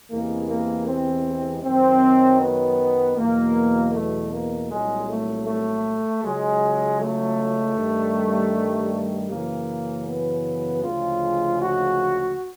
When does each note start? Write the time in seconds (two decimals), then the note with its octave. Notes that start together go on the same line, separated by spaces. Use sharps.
0.10 E2 C3 E3 G#3 A#3
0.48 A#3
0.87 C4
1.63 F#2 D#3 F#3 C4
2.40 B3
3.17 E2 B2 F#3 A#3
3.94 A3
4.31 A#3
4.70 C2 A#2 F#3 G#3
5.08 A3
5.47 A3
6.23 C#2 C#3 F#3 G#3
7.00 A3
7.76 G2 D#3 G3
9.29 F#2 C#3 E3 A#3
10.06 B3
10.82 D2 C#3 F3 G#3 F4
11.60 F#4